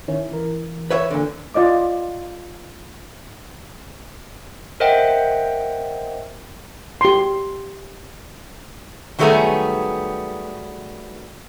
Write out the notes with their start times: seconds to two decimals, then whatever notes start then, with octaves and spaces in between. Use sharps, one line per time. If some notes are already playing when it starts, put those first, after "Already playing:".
0.08 D#3 C#4 E4
0.32 E3 A#4
0.91 B4 C#5 E5
1.11 A#2 D3
1.54 F4 D5 D#5 D6
4.80 A#4 C5 D#5 E5 F#5 G5
7.01 G4 C6
9.19 D#3 F#3 G3 A3 B3 G#4